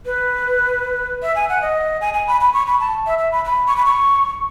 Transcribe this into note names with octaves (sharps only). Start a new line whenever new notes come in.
B4
E5
G#5
F#5
D#5
G#5
G#5
B5
B5
C#6
B5
A5
E5
E5
B5
B5
C#6
B5
C#6